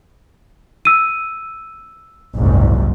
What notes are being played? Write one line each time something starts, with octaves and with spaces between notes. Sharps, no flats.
E6 D#7
F#1 C2 G#2